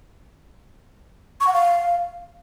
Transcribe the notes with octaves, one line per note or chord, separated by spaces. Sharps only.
C#6
F#5
F5